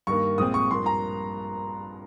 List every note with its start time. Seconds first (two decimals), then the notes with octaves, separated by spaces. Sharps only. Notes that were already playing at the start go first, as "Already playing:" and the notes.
0.07 G2 D#3 A#3 C#6
0.38 A#1 A#2 G#3 C4 D#6
0.54 C#6
0.71 G2 F3 A#3 C6
0.86 A#5